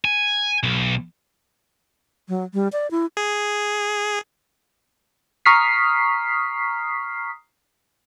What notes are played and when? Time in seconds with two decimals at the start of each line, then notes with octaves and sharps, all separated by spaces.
0.05 G#5
0.63 B1
2.29 F#3
2.54 G3
2.73 D5
2.91 E4
3.17 G#4
5.46 A#5 C#6 D#6 F6 B6 C7